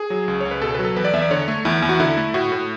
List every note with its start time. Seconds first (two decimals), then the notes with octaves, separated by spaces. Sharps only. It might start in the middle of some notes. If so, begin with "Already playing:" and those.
Already playing: G#4
0.10 F#3
0.28 C#2
0.41 C#2 C#5
0.51 B4
0.62 B2 A4
0.74 F#3 B4
0.85 A4
0.96 E2 B4
1.05 D5
1.13 E2 E5
1.22 D5
1.31 D3 C#5
1.48 A3
1.65 E2 E4
1.82 E2
1.89 F#4
2.00 D3 E4
2.17 A3
2.34 A2 F#4
2.52 A2